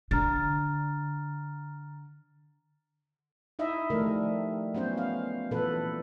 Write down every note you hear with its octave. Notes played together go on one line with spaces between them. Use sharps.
D3 A#5 F6 A6
D#4 E4 D#5 E5
D#3 F3 G3 A3 A#4
F#3 B3 C#4 C5
F5
A#2 E3 A4 B4